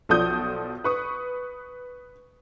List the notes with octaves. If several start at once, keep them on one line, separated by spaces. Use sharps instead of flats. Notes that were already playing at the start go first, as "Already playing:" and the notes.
B1 F3 A4 D5 D#6 G6
B4 C#6 D#6